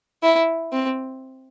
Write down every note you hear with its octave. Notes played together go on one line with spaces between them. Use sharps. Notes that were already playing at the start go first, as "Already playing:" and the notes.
E4
C4